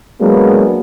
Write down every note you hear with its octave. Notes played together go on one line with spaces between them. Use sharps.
F#3 G#3 A#3 B3 D4